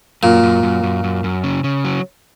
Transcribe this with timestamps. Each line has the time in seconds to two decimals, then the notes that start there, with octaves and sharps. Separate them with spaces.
0.23 F#2 A#2
0.43 F#2
0.63 F#2
0.83 F#2
1.04 F#2
1.24 F#2
1.44 C#3
1.64 C#3
1.85 F#3